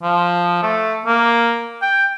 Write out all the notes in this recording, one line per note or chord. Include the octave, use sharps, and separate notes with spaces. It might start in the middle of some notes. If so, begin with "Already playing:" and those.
F3
A3
A#3
G5